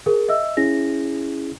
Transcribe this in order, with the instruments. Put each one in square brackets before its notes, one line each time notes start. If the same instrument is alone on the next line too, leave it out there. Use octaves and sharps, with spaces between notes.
[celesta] G#4 A#4
D#5 E5 E6
[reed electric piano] C#4 E4 G#4 [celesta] A#6